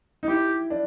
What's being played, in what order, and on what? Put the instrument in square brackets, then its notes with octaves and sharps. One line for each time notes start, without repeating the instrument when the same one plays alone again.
[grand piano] D#4
[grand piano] E4 [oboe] G4
[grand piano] D4